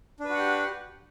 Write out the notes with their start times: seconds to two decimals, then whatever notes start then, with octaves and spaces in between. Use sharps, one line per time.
0.20 D4
0.25 B4
0.29 F#4
0.34 F#5
0.38 G4